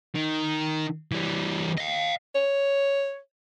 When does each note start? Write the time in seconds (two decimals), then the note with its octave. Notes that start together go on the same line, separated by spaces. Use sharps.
0.15 D#3
1.12 E3 G3
1.78 D#5 F5
2.35 C#5